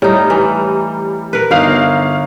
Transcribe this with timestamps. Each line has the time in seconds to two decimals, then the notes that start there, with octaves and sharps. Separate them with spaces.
0.02 A2 G3 D#4 A#5
0.30 E3
1.33 A#4 B4
1.51 G1 D#4 F5 F7